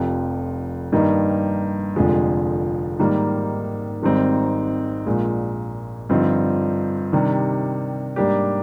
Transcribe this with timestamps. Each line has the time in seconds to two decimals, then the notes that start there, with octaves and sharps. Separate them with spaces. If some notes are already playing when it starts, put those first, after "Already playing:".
Already playing: F1 F2 C3
0.92 G2 D#3 A#3 D#4
1.96 F1 F2 D3 F3 G#3
2.99 G#2 D#3 G3 A#3
4.03 G#1 G#2 G3 C4 D#4
5.06 A#1 A#2 G#3
6.09 G2 D3 F3 C4 D#4
7.13 C3 D#3 G3 D4
8.16 G#2 G3 A#3 D4 G4